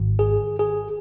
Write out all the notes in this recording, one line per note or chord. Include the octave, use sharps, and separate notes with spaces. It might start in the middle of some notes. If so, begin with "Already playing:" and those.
Already playing: G#1 G#2 D#3
G#4
G#4